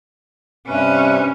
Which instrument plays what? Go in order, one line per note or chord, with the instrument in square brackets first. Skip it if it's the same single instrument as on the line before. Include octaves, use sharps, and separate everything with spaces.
[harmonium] G2 C3 B4 [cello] C#4